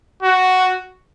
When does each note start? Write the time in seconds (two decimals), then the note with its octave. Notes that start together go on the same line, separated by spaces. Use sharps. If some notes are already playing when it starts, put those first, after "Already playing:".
0.23 F#4